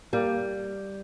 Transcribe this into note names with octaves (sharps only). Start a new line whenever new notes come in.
G3 A#3